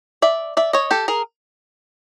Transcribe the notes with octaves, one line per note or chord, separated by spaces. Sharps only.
D5 E5
D5 E5
C#5 D#5
G4 A4
G#4 A#4